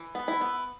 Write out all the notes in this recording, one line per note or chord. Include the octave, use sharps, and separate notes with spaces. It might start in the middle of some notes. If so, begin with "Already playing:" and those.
Already playing: E3
B3
E4
B3